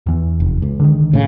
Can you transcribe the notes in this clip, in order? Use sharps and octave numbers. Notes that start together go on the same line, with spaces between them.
E2 E3
F1
C#2
D3 D#3
A2 C#3